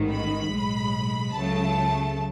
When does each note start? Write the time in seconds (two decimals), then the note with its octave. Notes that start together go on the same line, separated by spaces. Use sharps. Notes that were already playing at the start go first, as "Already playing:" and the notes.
Already playing: A1 G#2 D#3
0.10 B5
0.51 B1 A2 G#3
1.34 C#2 C#3 F#3 A3 A5